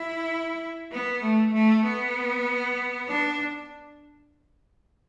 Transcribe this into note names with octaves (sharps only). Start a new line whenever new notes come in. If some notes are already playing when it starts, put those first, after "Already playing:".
Already playing: E4
B3
A3
A3
B3
D4